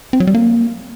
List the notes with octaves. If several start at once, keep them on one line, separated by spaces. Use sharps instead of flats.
C4
F#3
G3
A#3